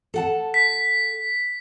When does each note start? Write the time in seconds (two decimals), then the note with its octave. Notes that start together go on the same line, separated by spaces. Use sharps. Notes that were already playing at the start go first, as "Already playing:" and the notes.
0.14 A4 F#5 A5
0.54 B6